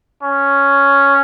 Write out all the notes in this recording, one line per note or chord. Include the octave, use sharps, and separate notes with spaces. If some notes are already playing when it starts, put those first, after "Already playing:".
C#4